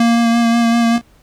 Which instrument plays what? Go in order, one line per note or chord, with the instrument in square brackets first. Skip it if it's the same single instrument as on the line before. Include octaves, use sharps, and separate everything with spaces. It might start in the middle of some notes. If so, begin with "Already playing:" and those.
Already playing: [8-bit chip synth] A#3